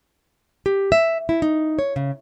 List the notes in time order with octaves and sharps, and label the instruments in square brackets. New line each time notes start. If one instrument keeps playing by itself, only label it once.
[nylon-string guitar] G4
E5
E4
D#4
C#5
C#3